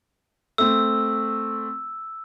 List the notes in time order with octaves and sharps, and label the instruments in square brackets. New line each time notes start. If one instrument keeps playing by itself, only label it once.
[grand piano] A3 C4 [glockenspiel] E6